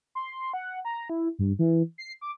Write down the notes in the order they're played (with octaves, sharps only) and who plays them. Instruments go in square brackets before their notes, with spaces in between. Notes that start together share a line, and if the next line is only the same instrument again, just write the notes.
[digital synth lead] C6
F#5
A#5
E4
G2
E3
C7
D6